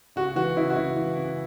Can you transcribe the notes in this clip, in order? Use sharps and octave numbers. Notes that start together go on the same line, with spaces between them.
C#3 F#4
E3 F#4
C#3 E4
F#4
C#3 E4
E3
C#3